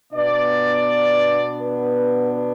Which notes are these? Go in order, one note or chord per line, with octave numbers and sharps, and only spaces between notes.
B2 B3 D4 D5
B4